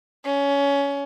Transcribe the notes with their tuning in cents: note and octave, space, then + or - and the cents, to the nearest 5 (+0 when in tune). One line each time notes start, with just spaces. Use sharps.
C#4 +20